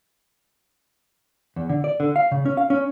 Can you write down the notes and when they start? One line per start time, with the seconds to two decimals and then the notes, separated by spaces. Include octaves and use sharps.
1.56 E2
1.69 D3
1.84 D5
2.00 D3
2.16 F5
2.32 C#3
2.45 C#4
2.57 F5
2.70 C#4